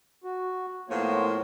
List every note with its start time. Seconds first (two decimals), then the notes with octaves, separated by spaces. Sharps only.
0.24 F#4
0.89 A2 F3 A#3 B3 C5 C#5